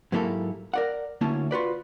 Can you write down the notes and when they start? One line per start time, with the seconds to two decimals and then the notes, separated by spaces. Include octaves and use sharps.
0.12 G#2 F#3 A#3 E4 G4 A4
0.74 A#4 D5 F#5
1.21 D2 A#3 C#4 E4 A5
1.51 F4 F#4 B4 D5